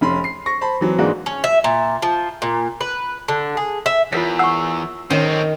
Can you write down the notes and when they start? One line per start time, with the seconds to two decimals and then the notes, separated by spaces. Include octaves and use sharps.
0.01 F1 C#4 B5 C6
0.24 C7
0.46 C#6 A#6
0.61 C5 A5 B5
0.81 E3 F#3 C4
0.98 G#2 E3 G#3 A#3 D4 F#4
1.26 C#4
1.44 E5
1.64 A#2
2.02 F3
2.42 A#2
2.81 B4
3.28 D3
3.57 G#4
3.86 E5
4.13 E2 F4 A#4 C#5 B6
4.39 F#5 C#6 E6
5.10 A2 D#3 C4 C#4